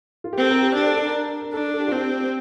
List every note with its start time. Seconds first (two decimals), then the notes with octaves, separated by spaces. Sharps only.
0.24 F4
0.33 G4
0.37 C4 A4
0.50 A#4
0.63 G4
0.76 D4 G4
0.86 A4
0.96 A4
1.05 A#4
1.42 A#4
1.54 D4 A4
1.73 A4
1.80 G4
1.87 F4
1.92 C4 G4